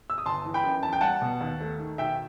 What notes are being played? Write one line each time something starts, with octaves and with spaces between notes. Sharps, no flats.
E6
D#6
G1 A5 C6
E3
G5 B5
F#2
E2 A5
G5
G3 F#5 A5
B2
D#2
A3
D#3
B1 E5 G5